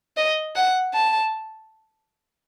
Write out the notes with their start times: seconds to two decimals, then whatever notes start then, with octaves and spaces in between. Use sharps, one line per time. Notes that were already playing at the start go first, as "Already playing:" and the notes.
0.17 D#5
0.56 F#5
0.94 A5